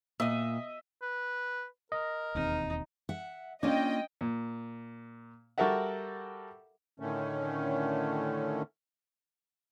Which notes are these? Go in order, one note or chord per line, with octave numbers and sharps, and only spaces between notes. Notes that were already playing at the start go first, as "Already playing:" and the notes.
A#2 D#5 E5
B4
A#4 D#5
E1 D#2 C4 D#4
E5 F#5
A#3 C#4 D4 F4 D#5 G5
A#2
G3 F#4 A4 A#4 E5 F#5
A2 D3 D#3 A3 C#4